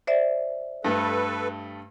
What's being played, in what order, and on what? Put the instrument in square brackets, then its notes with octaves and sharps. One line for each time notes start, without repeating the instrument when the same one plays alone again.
[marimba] C5 D5 E5
[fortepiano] G2 A3 [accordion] A4 B4